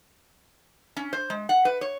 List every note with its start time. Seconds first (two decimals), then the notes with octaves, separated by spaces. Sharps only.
0.97 C#4
1.13 C5
1.30 G#3
1.49 F#5
1.65 B4
1.81 C#5